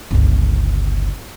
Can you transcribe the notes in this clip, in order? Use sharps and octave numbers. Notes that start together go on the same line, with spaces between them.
G1 C#2